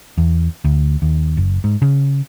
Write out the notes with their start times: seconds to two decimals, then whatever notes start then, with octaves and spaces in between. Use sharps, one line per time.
0.18 E2
0.65 D2
1.02 D#2
1.37 F#1
1.64 G#2
1.82 C#3